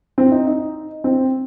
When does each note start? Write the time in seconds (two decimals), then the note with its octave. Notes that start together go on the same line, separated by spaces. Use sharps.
0.18 C4
0.32 D#4
0.47 D#4
1.04 C4